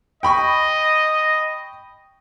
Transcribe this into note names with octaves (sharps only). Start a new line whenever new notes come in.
D#5 G5 B5 C#6